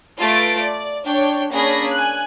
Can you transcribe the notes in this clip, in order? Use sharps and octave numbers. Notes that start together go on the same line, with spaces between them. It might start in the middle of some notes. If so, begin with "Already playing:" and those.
A3 F4 B4 A5 A6 D7
D5
D4 C#5 G5
A#3 C#4 D4 G#4 B5 A#6
G#5 F#6